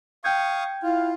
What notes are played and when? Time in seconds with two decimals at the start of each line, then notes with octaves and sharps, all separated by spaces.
0.24 F5 G5 C#6 D#6 G6 G#6
0.83 E4 F4 F5